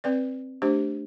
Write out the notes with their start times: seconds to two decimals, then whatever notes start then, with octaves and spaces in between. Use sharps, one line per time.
0.04 C4 B4 D5
0.62 A3 D4 G4 C5